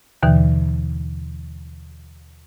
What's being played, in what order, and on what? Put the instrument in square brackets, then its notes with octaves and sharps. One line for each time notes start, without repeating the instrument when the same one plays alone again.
[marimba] D#2 B2 D3 E3